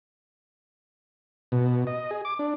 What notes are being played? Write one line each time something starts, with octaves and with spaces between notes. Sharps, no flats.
B2
D#5
G#4
D6
D4